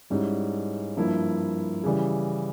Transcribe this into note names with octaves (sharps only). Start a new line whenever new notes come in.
G#2 G3 C#4 E4
G2 F3 A#3 E4
C#3 E3 G3